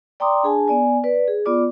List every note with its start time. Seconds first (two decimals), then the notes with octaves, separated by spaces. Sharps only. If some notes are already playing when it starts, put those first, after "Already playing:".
0.20 D5 G5 A#5 C6 D6 D#6
0.43 D4 G#4 G#5 A5
0.68 B3 D5 G#5
1.04 B4 D5
1.28 G#4
1.46 B3 F4 D5 D6